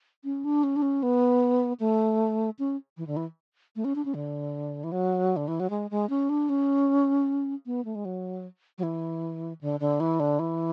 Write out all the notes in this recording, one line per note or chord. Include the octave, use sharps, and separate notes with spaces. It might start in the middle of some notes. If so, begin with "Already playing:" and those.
C#4
D4
C#4
D4
C#4
B3
A3
C#4
E3
D3
E3
A3
C#4
D4
C#4
D3
E3
F#3
D3
E3
F#3
G#3
G#3
C#4
D4
C#4
B3
A3
G#3
F#3
F#3
E3
D3
D3
E3
D3
E3